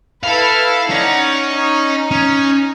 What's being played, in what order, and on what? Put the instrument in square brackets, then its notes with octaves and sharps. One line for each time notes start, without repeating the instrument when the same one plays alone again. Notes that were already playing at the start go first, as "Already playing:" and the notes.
[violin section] E4 A4 B4 [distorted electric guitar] F5
[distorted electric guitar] C#4 [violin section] D#4 D5 F#5
[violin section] D#4
[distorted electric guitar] C#4